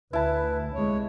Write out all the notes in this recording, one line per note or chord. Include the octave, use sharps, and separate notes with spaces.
D2 E4 B4 A5
C2 E3 G#3 C#5